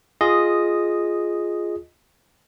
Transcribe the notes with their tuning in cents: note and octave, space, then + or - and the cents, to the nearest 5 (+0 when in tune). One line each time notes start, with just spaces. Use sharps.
F4 +0 G#4 +0 D#5 -5